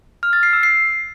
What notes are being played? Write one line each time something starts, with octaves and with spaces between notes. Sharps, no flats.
F6
A6
C7
E6
C7